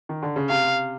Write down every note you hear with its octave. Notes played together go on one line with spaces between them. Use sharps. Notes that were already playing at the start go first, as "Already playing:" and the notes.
D#3
D3
C#3
C3 F5